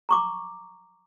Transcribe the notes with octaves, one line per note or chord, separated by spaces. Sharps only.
A#5 C#6 D6